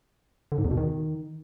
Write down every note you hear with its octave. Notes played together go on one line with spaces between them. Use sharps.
D3
G#2
E2
B2
D#3